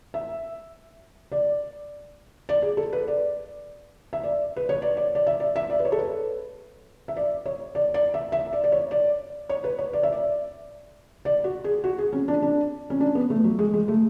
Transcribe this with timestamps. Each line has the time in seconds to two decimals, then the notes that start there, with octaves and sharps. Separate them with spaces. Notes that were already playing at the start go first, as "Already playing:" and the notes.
0.14 E5
1.32 D5
2.49 D5
2.62 G#4
2.77 A4
2.93 B4
3.07 D5
4.13 E5
4.23 D5
4.57 B4
4.69 C#5
4.82 D5
4.97 D5
5.15 D5
5.27 E5
5.40 D5
5.56 E5
5.70 D5
5.79 B4
5.85 C#5
5.92 A4
5.98 B4
7.08 E5
7.17 D5
7.46 C#5
7.75 D5
7.94 D5
8.14 E5
8.32 E5
8.53 D5
8.64 D5
8.72 C#5
8.91 D5
9.49 C#5
9.64 B4
9.78 C#5
9.93 D5
10.03 E5
10.13 D5
11.25 D5
11.44 F#4
11.64 G#4
11.84 F#4
11.98 G#4
12.13 C#4
12.28 D4
12.42 D4
12.90 C#4
13.00 D4
13.15 B3
13.30 A3
13.44 F#3
13.59 G#3
13.74 G#3
13.88 A3